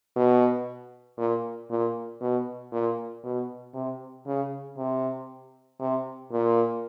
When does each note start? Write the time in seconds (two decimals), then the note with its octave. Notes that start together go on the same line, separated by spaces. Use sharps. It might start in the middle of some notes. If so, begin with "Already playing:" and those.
0.16 B2
1.18 A#2
1.70 A#2
2.21 B2
2.72 A#2
3.24 B2
3.74 C3
4.27 C#3
4.78 C3
5.80 C3
6.32 A#2